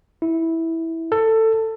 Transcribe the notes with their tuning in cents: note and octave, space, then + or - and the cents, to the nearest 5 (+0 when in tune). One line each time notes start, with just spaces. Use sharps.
E4 -10
A4 +15